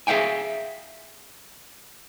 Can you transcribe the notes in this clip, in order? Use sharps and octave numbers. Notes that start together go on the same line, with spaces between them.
G#4 E5 F5 G5 G#5